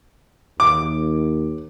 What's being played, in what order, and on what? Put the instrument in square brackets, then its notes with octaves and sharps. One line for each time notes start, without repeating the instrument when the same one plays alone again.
[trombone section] D#2 [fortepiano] D6